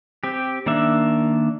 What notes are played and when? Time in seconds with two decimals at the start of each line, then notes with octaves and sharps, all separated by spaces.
0.24 C4 G4
0.66 D#3 A#3 D4 E5